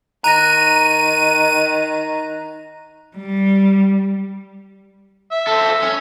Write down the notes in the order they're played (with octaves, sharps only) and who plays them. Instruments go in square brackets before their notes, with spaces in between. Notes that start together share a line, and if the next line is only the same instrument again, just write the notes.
[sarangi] D#3 [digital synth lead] A#5 [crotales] F#6 A#6 [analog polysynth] D#7
[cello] G3
[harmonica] E5
[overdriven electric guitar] A4 C5
C#4